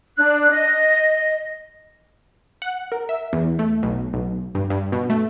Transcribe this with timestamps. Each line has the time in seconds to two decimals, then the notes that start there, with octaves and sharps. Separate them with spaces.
0.16 D4 F#6
0.50 D#5
2.62 F#5
2.92 A#4
3.09 E5
3.33 E2
3.59 A3
3.83 B1
4.14 B1
4.55 G2
4.70 G2
4.92 B2
5.10 A3